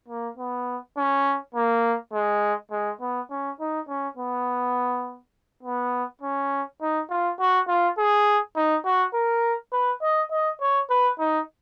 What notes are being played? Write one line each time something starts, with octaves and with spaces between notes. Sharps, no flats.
A#3
B3
C#4
A#3
G#3
G#3
B3
C#4
D#4
C#4
B3
B3
C#4
D#4
F4
F#4
F4
G#4
D#4
F#4
A#4
B4
D#5
D#5
C#5
B4
D#4